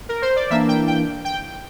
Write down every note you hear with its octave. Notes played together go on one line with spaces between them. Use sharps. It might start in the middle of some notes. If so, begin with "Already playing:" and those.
A#4
C5
D5
E3 A#3 D4 E5
G5
G5
G5